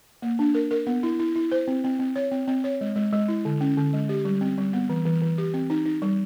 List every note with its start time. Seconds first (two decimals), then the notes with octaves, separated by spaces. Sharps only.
0.22 A#3
0.39 D4
0.55 A#4
0.71 A#4
0.87 B3
1.03 E4
1.20 E4
1.36 E4
1.52 C5
1.67 C4
1.84 C4
1.99 C4
2.16 C#5
2.31 C4
2.48 C4
2.64 C#5
2.81 G#3
2.96 G#3
3.13 G#3
3.28 E4
3.45 D3
3.61 C#4
3.77 D3
3.93 G#3
4.09 G4
4.25 G3
4.41 C4
4.58 G3
4.73 B3
4.89 E3
5.05 E3
5.22 E3
5.38 G4
5.54 C4
5.70 D#4
5.86 D#4
6.02 G3